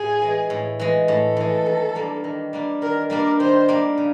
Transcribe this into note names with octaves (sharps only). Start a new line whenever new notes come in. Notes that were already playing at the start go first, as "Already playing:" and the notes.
Already playing: A2 G#4
E3 G#3
A2
E3 G#3
A2 A4
E3 G#3
D#3
G3 A#3 D4
D#3
G3 A#3 D4
D#3 A#4
G3 A#3 D4 A#4
D#3 C5
G3 A#3 D4
C#3